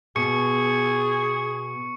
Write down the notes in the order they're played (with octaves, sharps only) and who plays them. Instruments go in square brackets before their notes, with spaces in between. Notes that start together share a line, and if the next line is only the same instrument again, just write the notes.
[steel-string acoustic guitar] B2 [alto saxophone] G#4 [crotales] C#6 C#7